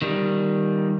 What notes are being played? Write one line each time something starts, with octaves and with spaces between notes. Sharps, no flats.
D#3 G3